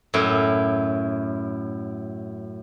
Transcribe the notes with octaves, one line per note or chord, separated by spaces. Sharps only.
F#2 A2 E4